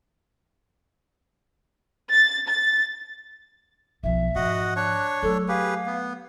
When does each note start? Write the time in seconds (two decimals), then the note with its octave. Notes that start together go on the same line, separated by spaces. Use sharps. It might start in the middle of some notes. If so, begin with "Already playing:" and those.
2.12 A6
2.48 A6
4.03 B1 F3 E5
4.35 G#2 F3 F#4 D#5 F#5
4.76 D4 C#5 C#6 F#6
5.23 F#3 A3 A4
5.48 G4 G#4 B4 F5
5.86 B3